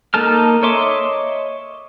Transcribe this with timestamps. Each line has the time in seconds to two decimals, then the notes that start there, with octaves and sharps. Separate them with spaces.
0.14 A#3 D#4 A4 A5 F6
0.63 C#5 D#5 E5 C6 D6